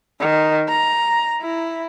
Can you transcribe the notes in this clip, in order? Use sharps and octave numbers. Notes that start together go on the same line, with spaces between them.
D#3
A#5
E4